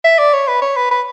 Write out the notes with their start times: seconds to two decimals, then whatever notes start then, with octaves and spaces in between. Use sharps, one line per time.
0.04 E5
0.19 D5
0.33 C#5
0.48 B4
0.62 C#5
0.77 B4
0.91 B4